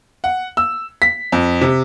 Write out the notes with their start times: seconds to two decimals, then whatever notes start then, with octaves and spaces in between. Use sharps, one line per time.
0.24 F#5
0.57 E6
1.02 B6
1.32 F2
1.61 C3